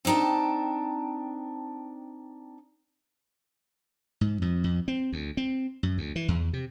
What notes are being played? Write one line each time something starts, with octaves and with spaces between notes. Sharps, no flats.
C4 D4 D#4 G5 A5
G#2
F2
F2
C4
D2
C4
F#2
D2
E3
E2
C3